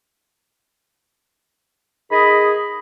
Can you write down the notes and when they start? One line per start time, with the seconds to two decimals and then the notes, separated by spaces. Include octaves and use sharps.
2.10 D#3 G#4 D#5 B5